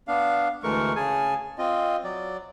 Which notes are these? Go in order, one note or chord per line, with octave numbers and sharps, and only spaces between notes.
B3 D4 F5
D2 E3 G#3 A3 A#4 C#6
C#3 G#4 G#5 A5
C4 F4 D#5
F#3 D5